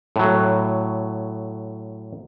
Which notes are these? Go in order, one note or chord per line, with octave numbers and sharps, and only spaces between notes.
A2 F#3